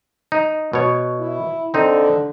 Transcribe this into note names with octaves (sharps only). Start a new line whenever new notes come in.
D#4
B2 C#5
E4
D3 C4 D#4